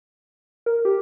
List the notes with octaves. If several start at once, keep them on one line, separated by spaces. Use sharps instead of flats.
A#4
G4